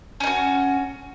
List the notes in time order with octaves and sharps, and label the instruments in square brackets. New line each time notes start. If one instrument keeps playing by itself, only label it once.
[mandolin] C#4
D#4
F#4